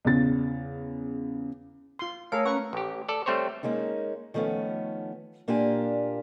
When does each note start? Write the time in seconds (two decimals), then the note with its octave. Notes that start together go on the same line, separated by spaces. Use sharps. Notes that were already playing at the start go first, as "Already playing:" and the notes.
0.05 E2 C#3 A6
1.99 F4 C6
2.32 A3 G#4 A#4 C#5 F5 E6
2.45 C#4 B4 F#5 A#5 C#6
2.73 A1 G4
3.09 A4 D5
3.26 G3 A3 C4 C5 C#5
3.63 G#3 A#3 C#4 D#4
4.34 D#3 F3 A3 B3 C#4
5.48 A#2 A#3 D4 F4 G4 G#5